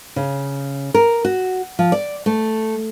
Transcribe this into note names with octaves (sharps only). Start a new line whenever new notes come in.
C#3
A#4
F#4
F3
D5
A3